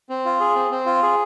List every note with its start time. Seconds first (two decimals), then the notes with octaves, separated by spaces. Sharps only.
0.09 C4
0.25 F4
0.40 G#4
0.55 C4
0.71 C4
0.86 F4
1.03 G#4